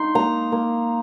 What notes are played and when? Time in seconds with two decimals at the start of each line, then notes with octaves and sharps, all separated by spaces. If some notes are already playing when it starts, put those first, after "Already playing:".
Already playing: D#4 C6
0.15 A#3 A#5
0.52 A#3